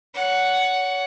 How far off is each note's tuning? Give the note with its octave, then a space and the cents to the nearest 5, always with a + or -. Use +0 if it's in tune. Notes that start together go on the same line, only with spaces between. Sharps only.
C#5 +30 F#5 +0